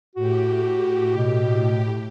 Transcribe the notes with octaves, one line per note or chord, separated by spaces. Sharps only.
A2 F#4 G4
B2